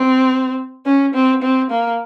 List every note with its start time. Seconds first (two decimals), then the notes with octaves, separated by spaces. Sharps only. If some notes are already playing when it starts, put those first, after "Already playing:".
Already playing: C4
0.86 C#4
1.14 C4
1.42 C4
1.70 A#3